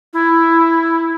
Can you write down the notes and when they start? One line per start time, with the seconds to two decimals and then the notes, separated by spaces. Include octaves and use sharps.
0.13 E4